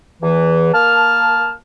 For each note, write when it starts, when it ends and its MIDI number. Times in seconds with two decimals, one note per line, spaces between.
0.23 0.73 40
0.23 0.73 52
0.74 1.52 58
0.74 1.52 81
0.74 1.52 89